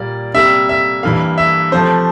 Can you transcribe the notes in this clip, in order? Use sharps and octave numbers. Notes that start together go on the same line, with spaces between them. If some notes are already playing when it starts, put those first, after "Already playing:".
Already playing: A#2 G3 A#3 D5
C3 G3 A#3 E5
E5
G2 E3 A#3 F5
E5
C3 F3 A3 C5